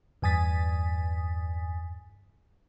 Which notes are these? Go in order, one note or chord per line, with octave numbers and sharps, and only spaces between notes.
E2 G2 G#5 D#6 A6 B6